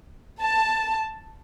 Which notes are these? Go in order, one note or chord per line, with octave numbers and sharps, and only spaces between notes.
A5